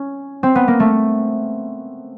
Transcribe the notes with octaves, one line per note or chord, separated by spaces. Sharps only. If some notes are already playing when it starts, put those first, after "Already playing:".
Already playing: C#4
C4
B3
A#3
A3